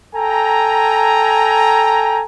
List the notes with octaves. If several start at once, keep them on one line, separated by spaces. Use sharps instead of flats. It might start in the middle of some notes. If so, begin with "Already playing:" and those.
A4 G5 G#5 A#5